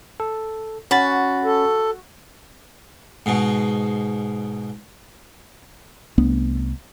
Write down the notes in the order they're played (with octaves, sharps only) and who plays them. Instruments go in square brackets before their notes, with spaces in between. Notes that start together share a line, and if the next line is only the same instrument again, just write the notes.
[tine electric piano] A4
[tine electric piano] C#4 B5 A6 [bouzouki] F#4
[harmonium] A4
[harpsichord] G#2 B2
[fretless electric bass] C2 A3 B3 D4